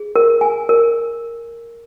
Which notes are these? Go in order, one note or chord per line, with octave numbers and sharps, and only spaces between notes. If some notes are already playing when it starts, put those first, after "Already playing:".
Already playing: G#4
A#4
G#5
A#4